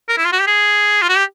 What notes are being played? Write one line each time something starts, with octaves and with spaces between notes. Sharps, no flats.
A#4
E4
F4
F#4
G4
G#4
F4
F#4
G4